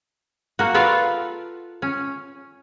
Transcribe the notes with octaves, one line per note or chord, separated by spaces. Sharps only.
A#3 F#4
F4 A4 B4 D5 E5 F5
C#4